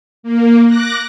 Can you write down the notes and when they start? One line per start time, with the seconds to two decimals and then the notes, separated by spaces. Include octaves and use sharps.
0.23 A#3
0.66 D6 F#6 A#6